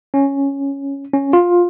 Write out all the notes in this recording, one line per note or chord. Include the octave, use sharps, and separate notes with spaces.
C#4
C#4
F4